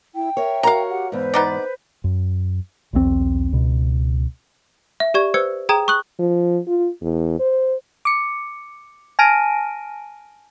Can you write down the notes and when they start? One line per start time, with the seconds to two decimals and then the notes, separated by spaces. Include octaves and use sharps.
0.15 E4 G5
0.37 A#4 C#5 E5
0.63 F#4 A#4 C#5 F5 A#5
0.90 G4 F#5
1.12 E2 G#2 B4 C5
1.34 B3 D#4 D5
2.04 F#2
2.93 B1 E2 D#3 C4
3.53 C#2 B2
5.00 E5
5.14 G4 D5 C#6 G#6
5.34 B4 C5 E6 G#6 C#7
5.69 G#4 G5 A#5 D#6 G#6 D#7
5.88 C#6 D#6 F#6 F#7
6.19 F3
6.67 F4
7.02 E2
7.39 C5
8.05 D6 C#7
9.19 G#5 A5 F6 A#6 D7 D#7